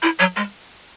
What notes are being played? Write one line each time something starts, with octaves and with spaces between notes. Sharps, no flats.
E4
F#3
G#3